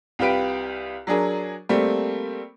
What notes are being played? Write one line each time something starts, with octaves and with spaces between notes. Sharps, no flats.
C2 F4 G4 B4 D7
F#3 D4 G#4 A#4
G3 A3 A#3 C4